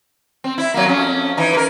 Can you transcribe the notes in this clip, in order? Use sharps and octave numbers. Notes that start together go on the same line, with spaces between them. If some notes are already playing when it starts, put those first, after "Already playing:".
C4
E4
F#3 A#3
F2 C#4
E3 D#4
A#4 B4